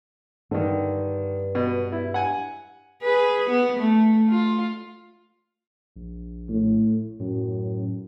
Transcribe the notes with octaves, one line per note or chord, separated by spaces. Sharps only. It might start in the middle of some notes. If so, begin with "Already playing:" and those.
G2 D3 D#3
B2
E4
F#5 G#5
G#4 B4
B3
A3
F4
A#1
A2
F#2 A2